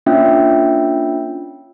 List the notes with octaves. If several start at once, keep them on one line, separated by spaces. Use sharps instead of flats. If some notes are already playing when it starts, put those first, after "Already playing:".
A#3 C#4 D4 F4 E5 G5